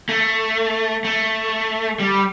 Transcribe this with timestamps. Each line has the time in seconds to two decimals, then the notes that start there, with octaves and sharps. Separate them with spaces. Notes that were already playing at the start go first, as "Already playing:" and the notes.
0.09 A3
1.04 A3
2.00 G3